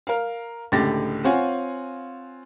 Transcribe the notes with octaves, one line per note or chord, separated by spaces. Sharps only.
A#4 F5
C#2 A2 D3 G4 A6 A#6
C4 F4 C#5 F5 F#5 G#5